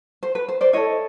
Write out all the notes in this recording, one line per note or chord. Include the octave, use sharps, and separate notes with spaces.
C5
B4
C5
C5 D5
E4 A4 C#5 D#5